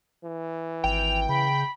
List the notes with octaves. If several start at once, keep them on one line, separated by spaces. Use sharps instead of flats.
E3
G#1 G5 F7
C#3 B5